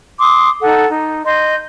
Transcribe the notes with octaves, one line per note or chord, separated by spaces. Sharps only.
C6 D6 D#6
D#4 A4 F#5
D#4
D#5 C6 G6